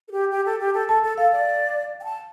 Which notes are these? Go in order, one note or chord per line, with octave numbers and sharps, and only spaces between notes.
A4
G4
G4
A4
G4
A4
A4 A5
A4
A4 F5
D5
G5
A5